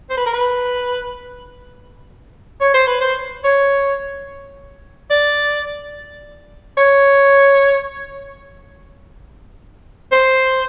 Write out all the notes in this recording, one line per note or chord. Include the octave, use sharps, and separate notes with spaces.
C5
B4
A#4
B4
C#5
C5
B4
C5
C#5
D5
C#5
C5